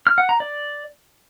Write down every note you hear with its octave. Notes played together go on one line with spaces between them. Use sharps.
F6
F#5
A#5
D5